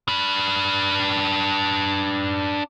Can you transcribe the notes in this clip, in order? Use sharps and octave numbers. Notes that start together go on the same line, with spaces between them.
D4 B4